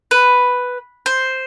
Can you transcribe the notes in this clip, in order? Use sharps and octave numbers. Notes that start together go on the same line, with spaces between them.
B4
C5